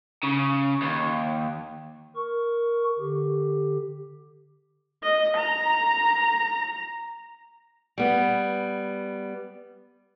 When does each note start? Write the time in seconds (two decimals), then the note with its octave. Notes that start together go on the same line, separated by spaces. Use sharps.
0.23 C#3
0.82 D#2
2.16 A#4 C#6
2.99 D3 G4
5.03 D#5
5.37 A#5
7.98 G3 B3